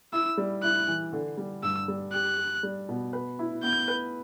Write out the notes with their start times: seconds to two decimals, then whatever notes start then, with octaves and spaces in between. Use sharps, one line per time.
0.13 E4 E6
0.37 G3
0.63 E4 F#6
0.88 E3
1.13 D3
1.37 G3
1.63 G2 E6
1.88 G3
2.13 G4 F#6
2.38 G4
2.63 G3
2.89 B2
3.13 B4
3.39 E4
3.63 B3 G6
3.88 B4